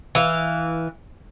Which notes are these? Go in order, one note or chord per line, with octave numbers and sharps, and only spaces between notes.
E3 F5